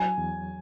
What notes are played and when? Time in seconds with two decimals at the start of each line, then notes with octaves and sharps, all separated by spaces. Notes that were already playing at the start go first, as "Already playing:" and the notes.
Already playing: F#3 G#5
0.18 E2